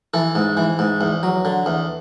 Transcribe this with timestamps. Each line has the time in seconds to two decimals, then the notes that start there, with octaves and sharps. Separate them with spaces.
0.14 E3 A4
0.35 G#2
0.57 E3
0.79 G#2
1.01 E2
1.23 F#3
1.45 D3
1.66 E2